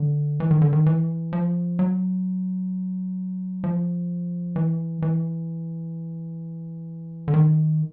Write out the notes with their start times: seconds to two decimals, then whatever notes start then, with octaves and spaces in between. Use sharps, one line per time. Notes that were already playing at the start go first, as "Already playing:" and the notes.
Already playing: D3
0.40 E3
0.51 D#3
0.62 D3
0.73 D#3
0.86 E3
1.33 F3
1.79 F#3
3.64 F3
4.56 E3
5.02 E3
7.28 D3
7.34 D#3